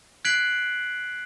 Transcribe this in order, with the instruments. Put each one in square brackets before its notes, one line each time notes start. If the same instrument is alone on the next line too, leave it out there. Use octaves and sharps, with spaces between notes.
[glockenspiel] F#6 G#6 B6 C7 D7 F#7